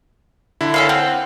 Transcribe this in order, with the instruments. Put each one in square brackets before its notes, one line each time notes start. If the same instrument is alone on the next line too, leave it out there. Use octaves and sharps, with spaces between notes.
[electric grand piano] D3 E4
[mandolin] C#4 A4 F5
[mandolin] C4 [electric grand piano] F#5